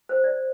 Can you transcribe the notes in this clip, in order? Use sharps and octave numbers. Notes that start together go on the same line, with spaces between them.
C5
D5